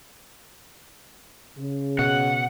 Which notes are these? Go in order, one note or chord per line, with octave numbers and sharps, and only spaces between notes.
C#3
B2 F#5